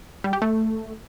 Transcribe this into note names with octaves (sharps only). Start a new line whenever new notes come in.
G3
G4
A3